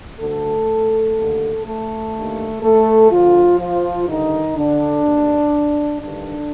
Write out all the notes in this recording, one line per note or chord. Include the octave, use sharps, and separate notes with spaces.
D2 D3 A3 A4
D#2 D3
A3 A4
D#2 D3
A3 A4
D2 D3 F3 F4
F3 F4
G2 D3 D#3 D#4
D3 D4
D#2 D3
G2 D3 D#3 D4